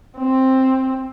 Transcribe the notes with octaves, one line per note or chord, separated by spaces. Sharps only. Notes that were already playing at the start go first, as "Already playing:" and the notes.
C4